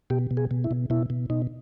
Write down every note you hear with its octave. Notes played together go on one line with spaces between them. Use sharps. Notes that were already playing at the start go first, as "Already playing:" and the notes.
B2 G4
B2
G#4
B2
E4
B2
B2 E4
B2
B2 D#4